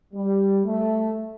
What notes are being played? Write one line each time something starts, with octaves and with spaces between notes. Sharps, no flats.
G3
A3